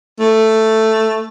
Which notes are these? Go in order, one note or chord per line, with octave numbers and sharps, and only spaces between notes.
A3